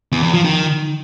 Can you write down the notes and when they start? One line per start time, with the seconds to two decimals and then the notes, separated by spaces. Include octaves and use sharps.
0.12 E2
0.23 E2
0.34 F3
0.44 D#3